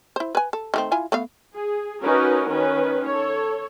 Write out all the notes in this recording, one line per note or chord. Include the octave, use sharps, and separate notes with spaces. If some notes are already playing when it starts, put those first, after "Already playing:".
E4 C5
B4 G#5
A4
D#3 A3 C4
E4 F4 G#5
A3 B3 F5
G#4
C#4 D#4 F#4 A#4 B4
D#3 C#4 B4
A4 C#5